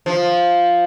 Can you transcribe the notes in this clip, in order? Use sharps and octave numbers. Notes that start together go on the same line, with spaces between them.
F3